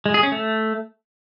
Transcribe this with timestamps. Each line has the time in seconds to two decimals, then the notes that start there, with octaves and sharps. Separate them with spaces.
0.06 G#3
0.14 G#4
0.23 C#4
0.32 A3